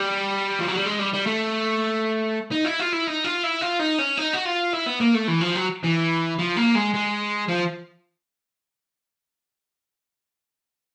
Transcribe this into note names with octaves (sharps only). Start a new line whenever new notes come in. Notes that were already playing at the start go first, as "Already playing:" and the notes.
Already playing: G3
F3
F#3
G3
G#3
G3
G3
A3
D#4
E4
F4
E4
D#4
F4
E4
F4
D#4
C#4
D#4
F#4
F4
E4
B3
A#3
A3
E3
F3
F#3
E3
F3
A#3
G#3
G#3
F3